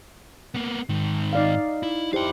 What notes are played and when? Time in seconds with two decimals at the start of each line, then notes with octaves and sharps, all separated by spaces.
0.55 A#3 B3
0.89 G#2 D#3
1.33 D#4 D5 F5
1.83 E4
2.13 E4 G4 C5 F5 G5